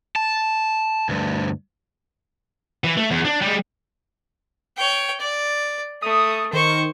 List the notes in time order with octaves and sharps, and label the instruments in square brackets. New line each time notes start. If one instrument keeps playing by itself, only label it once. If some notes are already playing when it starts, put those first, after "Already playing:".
[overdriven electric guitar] A5
D2 G2
[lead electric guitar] E3
A3
E2
D4
G3 G#3
[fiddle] C#5 G5
D5
[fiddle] A3 [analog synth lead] D#6
[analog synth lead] D#3 [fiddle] C5 C#6